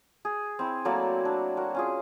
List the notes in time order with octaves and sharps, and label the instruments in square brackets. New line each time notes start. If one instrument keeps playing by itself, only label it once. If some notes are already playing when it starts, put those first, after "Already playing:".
[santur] G#4
C4 E4
F#3 A3 A#3 D5
D4
F#4 A#4
C#4 F4 G#4